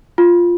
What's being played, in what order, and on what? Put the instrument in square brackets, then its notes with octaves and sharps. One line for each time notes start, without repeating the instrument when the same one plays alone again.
[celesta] F4